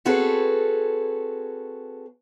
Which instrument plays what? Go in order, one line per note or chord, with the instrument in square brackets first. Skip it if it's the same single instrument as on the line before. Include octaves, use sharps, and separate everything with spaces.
[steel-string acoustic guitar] C4 F#4 G#4 A4 B4 C#5